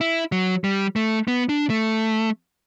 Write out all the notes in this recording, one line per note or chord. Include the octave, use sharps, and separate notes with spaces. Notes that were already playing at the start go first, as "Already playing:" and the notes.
E4
F#3
G3
A3
B3
D4
A3